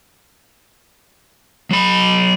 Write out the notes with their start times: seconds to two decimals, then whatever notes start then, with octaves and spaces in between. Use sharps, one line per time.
1.71 F#3 B5